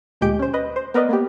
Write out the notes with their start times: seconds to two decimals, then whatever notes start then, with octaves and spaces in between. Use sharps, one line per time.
0.21 D2 A#2 G#3 G4 G6 D7
0.39 C#4 C5
0.54 B4 D#5
0.76 C5
0.94 B3 A#4 B4 D5 D#5
1.09 A#3 B3 G4